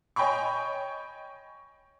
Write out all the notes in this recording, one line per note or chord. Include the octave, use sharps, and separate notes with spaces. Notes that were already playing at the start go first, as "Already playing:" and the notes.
C#5 D#5 G5 G#5 B5 C#6